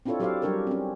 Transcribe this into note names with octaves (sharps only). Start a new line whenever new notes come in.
C4 D4 E4 F4 A4 C#5
F#3 G4 A4 C5 D5 F5
F#3 G3 D4 G4 A#4 C#5
C4 C#4